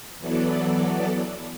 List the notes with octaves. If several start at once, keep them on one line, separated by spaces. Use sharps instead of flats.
E3 F#3 B3 A4 D5